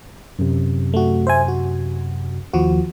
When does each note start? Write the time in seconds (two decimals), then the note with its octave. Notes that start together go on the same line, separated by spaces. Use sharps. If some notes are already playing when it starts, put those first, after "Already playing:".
0.39 F#2 C3
0.94 A3 F#4
1.27 C5 E5 G#5
1.48 F#4
2.53 D#2 F3 F#4